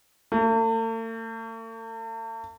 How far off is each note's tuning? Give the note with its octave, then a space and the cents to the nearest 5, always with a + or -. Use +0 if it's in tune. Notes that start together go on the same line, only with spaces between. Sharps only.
A3 +45